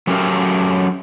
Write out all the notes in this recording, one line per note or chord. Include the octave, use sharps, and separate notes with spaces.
F#3 A3 C#4 G4 A#4